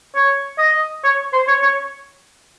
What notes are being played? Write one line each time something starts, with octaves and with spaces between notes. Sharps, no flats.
C#5
D#5
C#5
C5
C#5
C#5